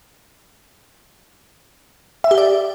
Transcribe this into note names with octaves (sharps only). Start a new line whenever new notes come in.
E5
G4
D5